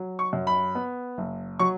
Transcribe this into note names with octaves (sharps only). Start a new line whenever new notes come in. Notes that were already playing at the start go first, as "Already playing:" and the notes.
Already playing: F#3
C#6
F#2
B5
B3
F#1
F#3 C#6